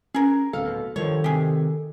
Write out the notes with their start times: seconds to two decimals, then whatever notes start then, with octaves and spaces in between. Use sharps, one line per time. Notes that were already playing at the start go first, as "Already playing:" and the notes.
0.14 C#4 G#4 A#4
0.53 D1 D2 B2 A4 F5
0.96 G2 D#3 F3 C#5
1.24 C3 G4 G#4